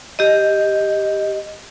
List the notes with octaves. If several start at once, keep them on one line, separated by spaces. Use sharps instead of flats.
G4 D#5